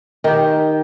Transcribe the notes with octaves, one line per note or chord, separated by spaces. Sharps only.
D#3 G4